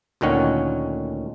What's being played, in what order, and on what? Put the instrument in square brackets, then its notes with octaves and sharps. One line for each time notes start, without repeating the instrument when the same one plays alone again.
[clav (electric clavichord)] D2 A#2 D#3 C#4 F#5